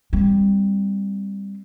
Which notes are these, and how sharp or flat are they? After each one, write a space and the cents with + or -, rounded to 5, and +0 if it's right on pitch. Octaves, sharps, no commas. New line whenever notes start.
G3 +20 C4 +0